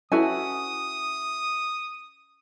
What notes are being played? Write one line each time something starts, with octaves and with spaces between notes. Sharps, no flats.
C#4 E4 F#4 A4 B4 G#5 D#6